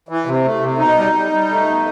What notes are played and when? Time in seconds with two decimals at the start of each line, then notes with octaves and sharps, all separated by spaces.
0.09 E3
0.26 C3
0.44 A3
0.61 C3
0.79 B2 D#4
0.97 G3
1.14 G3
1.32 G3
1.49 A3
1.66 B2